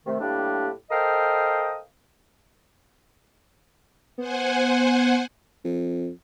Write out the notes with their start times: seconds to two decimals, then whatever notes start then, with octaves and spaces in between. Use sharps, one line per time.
0.06 C3 D#3 A3
0.20 A2 G3 A#3 D4 G4
0.91 A4 A#4 C5 D#5 F5 G5
4.18 B3 C5 F#5 G#5
5.64 F2